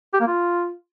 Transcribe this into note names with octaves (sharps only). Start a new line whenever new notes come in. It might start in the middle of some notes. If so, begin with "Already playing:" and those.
G4
A#3
F4